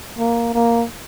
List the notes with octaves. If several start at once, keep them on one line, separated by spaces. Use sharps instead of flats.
A#3
A#3